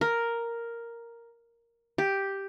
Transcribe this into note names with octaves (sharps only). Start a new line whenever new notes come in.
A#4
G4